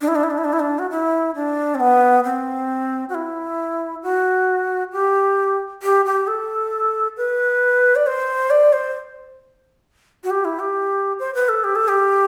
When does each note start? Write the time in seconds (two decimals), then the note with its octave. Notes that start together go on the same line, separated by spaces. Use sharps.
0.01 D4
0.08 E4
0.15 D4
0.23 E4
0.30 D4
0.38 E4
0.44 D4
0.53 E4
0.60 D4
0.79 F#4
0.90 E4
1.35 D4
1.75 C4
1.80 B3
2.24 C4
3.09 F#4
3.14 E4
4.03 F#4
4.92 G4
5.83 G4
6.05 G4
6.27 A4
7.17 B4
7.95 D5
8.07 C5
8.50 D5
8.73 C5
10.24 F#4
10.30 G4
10.45 E4
10.59 G4
11.19 C5
11.35 B4
11.49 A4
11.64 G4
11.75 A4
11.88 G4